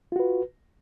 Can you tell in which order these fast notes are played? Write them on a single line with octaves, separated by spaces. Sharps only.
F4 F#4 B4